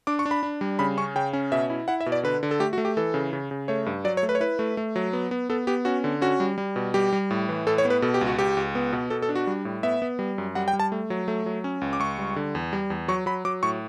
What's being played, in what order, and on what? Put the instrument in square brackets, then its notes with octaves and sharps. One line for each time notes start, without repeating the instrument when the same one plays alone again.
[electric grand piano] D4 D6
C#6
D4
B5
D4
G3
C#3 B5
C#4 C#6
C#3 G5
C#4
B2 E5
E4
E4 F#5
E5
B2
D5
D3 B4
D3
A4
A3 G4
F#4
A3
G4
E3 A4
C#3
C#3
C#3
A3 C#5
G2
F#3 D5
C#5
A3
B4
C#5
E4 B4
A3
A3
F#3
B3
B3
B3 A4
B3 G4
C#4 F#4
D3
C#4 F#4
G3
G3
B2
G3 G4
G3
A2
E3
A2 A4
C#5
B3
B4
B2 A4
G4
C#2
F#4
C#2 G4
C#2
B3
B2
B2 A4
A4
D4
F#4
G3
A2
B3 E5
B3
G3
F#2
G3 F#5
G5
G3
A5
A3
F#3
A3
F#3
C#4
C#2
D6
C#2 C#6
G3
D3
E2
G3
E2
F#3 C#6
F#3 B5
F#3 D6
A2 C#6